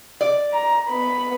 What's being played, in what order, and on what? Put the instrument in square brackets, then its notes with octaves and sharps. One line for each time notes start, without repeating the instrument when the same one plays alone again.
[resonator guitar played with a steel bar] D5
[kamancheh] A#5
B3 B5